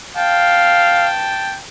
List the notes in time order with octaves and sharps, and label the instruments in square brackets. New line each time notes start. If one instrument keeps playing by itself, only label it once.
[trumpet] F5 [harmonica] G5 A5